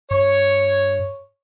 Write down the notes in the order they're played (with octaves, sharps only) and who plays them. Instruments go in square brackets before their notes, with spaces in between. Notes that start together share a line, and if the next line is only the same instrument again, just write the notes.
[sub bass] G2 [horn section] C#5